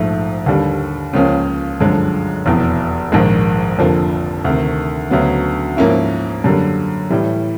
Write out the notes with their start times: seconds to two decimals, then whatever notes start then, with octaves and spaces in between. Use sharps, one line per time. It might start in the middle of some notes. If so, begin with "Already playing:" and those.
Already playing: A#1 G#2 F3 A3
0.46 D#2 D3 G3
1.13 C#2 C#3 F3 A#3 C#4
1.80 G1 F#2 D3 F3 G#3
2.46 F1 E2 B2
3.12 A#1 G#2 D#3 G#3
3.78 F1 F2 D3 F3 A#3
4.45 D2 C3 D#3
5.11 D2 C#3 F#3 B3
5.77 G#2 F3 A#3 C#4 E4
6.44 F#2 D3 G3 A#3
7.10 A2 E3 G3